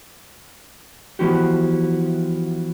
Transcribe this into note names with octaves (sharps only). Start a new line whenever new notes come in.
E3 F3 B3 E4 F#4 G4